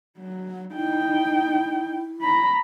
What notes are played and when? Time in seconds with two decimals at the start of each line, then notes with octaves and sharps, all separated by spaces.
0.18 F#3
0.75 D#4 E4 G5
2.21 A#5 B5